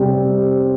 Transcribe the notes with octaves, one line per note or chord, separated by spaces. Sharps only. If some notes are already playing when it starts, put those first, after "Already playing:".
Already playing: C3 G3 C4